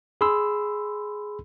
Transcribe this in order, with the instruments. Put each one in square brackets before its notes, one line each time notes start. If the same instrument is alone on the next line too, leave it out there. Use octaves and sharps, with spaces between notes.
[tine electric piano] G#4 B5 C6 E6